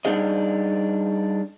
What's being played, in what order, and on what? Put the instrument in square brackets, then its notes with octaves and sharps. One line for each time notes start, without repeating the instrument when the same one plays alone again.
[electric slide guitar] G3 A#3 D4 D#4 G#4 D#5